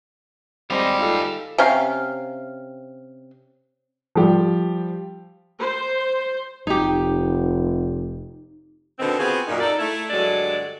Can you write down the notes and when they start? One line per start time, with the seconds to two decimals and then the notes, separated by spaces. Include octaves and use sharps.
0.70 G3 G#3 C4 C5 D#5 F5 G5
0.98 D#4 F4 A4
1.58 C3 C#4 F5
4.15 F3 G3 G4
5.59 C5
6.67 F1 D#4 G4
8.99 B2 D3 D#3 B3 C4
9.19 B3 C4 F4 F#4 G#4
9.47 F#2 A#2 D#4
9.60 D#4 A4 D5
9.79 A3 E4
10.10 G2 D3 F#3 G#3 A4 D5